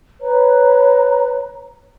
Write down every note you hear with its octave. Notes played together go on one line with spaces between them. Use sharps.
B4 C#5 A#5